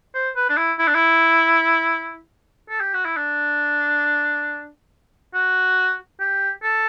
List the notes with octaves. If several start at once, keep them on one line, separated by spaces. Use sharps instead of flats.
C5
B4
D4
E4
E4
D4
E4
A4
G4
F#4
E4
D4
F#4
G4
A4